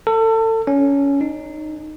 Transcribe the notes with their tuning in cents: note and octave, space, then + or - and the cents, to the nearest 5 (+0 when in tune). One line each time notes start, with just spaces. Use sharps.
A4 +30
C#4 +15
D#4 -15